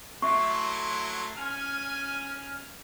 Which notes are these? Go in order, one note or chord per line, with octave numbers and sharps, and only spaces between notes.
F#3 A3 E4 E5 C6 C#6
C#4 G#5 F6